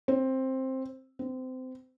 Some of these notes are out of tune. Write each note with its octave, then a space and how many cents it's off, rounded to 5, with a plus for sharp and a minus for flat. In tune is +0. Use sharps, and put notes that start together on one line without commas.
C4 +10
C4 -25